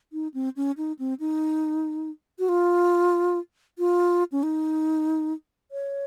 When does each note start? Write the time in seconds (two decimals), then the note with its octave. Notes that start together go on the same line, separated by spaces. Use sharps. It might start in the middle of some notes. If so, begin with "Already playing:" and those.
0.13 D#4
0.34 C4
0.56 C#4
0.77 D#4
0.99 C4
1.20 D#4
2.39 F#4
2.49 F4
3.78 F4
4.32 C#4
4.43 D#4
5.71 C#5